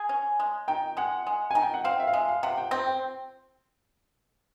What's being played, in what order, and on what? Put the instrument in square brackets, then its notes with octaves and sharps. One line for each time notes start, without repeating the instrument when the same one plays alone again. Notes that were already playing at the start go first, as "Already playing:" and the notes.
Already playing: [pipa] G#4 [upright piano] G#5
[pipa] C#4
G#3
[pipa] D#3 [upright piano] G5
[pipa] G#3 [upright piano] F#5
[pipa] G#3
[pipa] D#3 [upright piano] G#5
[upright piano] G5
F#5
[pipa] C4 [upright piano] F5
[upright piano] E5
F5
[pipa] G#3 [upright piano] E5
[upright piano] F5
[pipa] C3 [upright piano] F#5
[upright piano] G5
[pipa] C4 [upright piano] G5
[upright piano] G5